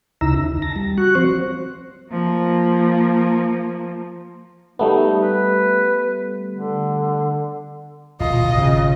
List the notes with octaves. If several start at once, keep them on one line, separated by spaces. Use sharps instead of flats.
D2 C#3 D#4 E4 A#5 E6
D#2
A5 A#6
G3
F#4 C#6 F#6
F3 C4 C5
F3 A#3
G3 A3 B3 D#4
B4
D3
D1 A#1 D#2 B2 F4 D#5
G#1 C#3